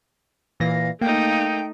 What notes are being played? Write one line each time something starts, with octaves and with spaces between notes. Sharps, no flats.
A#2 E3 F5 A#6
A3 A#3 D#4 G5